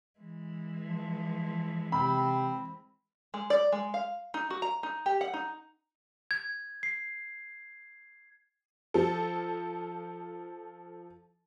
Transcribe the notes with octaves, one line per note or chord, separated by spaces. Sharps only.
E3 G#3
F3
C3 C4 B5
G#3
D5
G#3
F5
D#4
F#4
A#5
D#4
G4
F#5
D#4
G#6
C7
F3 A4